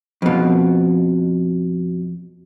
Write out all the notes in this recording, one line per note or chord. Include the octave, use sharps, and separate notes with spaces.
F2 B2